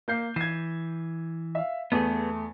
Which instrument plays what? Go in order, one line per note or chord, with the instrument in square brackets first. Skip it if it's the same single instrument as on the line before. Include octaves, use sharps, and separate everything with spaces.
[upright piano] A#3 G6 C7
[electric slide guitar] E3 [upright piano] G#6 C7
[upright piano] E5 F5
[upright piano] E2 A3 [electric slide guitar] B3 G#4